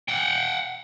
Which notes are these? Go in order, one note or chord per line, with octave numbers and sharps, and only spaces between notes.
F#5 G5